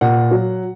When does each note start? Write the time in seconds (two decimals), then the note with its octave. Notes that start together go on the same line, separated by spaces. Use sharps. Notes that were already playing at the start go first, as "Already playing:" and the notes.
0.01 A#2 F#5
0.31 F#3